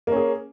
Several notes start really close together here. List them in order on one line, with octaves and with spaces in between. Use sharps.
A#3 C#4 G#4